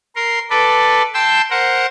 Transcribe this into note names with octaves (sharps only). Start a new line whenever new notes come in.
A#4 C6
A4 B4 D5
G5 A5 C6 E6
A#4 C5 F#5